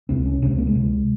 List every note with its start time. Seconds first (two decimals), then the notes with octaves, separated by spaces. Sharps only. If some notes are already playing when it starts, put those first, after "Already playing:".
0.09 C#2 C3 C4
0.25 C#4
0.42 C3 C#4
0.45 C#2 C4
0.58 A#3
0.67 G#3
0.75 C#2 C3